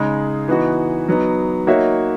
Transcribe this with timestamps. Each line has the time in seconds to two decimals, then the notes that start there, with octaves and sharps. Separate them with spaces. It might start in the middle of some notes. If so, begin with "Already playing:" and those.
Already playing: C#3 G#3 D#4
0.48 E3 B3 D#4 F#4
1.09 F#3 B3 D#4
1.67 A#3 D#4 F#4 C#5 E5